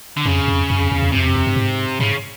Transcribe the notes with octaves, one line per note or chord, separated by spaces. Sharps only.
D3
F2 C#3
F2
F#2
F2
E2
E2
F2 C3
E2
F#2
F2
G2
G#2
G#2 C#3